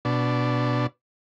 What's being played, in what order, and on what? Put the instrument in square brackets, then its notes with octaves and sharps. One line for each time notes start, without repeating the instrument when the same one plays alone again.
[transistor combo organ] B2 D4